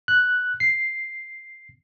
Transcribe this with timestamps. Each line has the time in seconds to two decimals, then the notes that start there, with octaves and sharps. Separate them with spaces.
0.08 F#6
0.60 C7